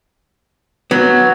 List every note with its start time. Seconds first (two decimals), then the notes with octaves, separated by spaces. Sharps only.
0.91 F#3 B3